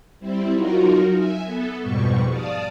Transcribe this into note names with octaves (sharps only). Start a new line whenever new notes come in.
G3 C4 E4
F#3 D#4 F4 F#4 A#4
E5 G#5
B3 A4
F2 G#2 B2 G3 C#6
D5 F5 A5 D#6